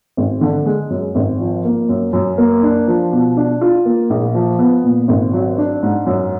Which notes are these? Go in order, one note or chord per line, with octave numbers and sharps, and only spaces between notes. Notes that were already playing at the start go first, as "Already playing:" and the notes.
G#1
D3
G#3
F#2
G#1
F3
A#3
F#2
F#2
A#3
D4
F3
B2
D4
F4
A#3
A#1
F3
B3
A#2
G#1
F#3
D4
G#2
F#2